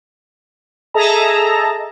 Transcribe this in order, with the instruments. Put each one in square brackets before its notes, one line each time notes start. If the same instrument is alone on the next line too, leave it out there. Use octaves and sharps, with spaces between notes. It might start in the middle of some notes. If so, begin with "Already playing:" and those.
[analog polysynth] G#4 A4 D#5 E5 A5 A#5